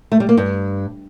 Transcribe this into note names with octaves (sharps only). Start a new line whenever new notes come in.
A3
G3
A#3
G2